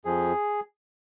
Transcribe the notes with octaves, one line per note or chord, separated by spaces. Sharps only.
F2 F3 G#4